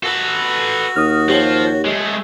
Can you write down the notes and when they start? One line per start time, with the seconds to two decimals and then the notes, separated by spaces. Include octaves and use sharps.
0.04 F#4 A4 B4
0.96 D#2 D#6 F6
1.30 F3 G4 C#5
1.85 G#3 A3